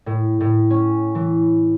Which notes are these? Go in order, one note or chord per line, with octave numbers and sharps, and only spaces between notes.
A2
A2
C#4
E3